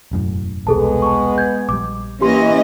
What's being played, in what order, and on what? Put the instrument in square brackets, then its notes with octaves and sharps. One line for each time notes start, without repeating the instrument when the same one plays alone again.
[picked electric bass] E1 F#2 A2
[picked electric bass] E1 C2 [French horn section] G#3 B3 [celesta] G#4 A4 A5
[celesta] A5 C#6
G6 G#6
[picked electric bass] A#1 G3 [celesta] D6
[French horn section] E3 [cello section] A#3 C#4 D#5 [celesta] G4 C6